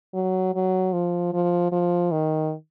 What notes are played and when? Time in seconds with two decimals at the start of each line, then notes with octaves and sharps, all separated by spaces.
0.14 F#3
0.55 F#3
0.93 F3
1.33 F3
1.72 F3
2.12 D#3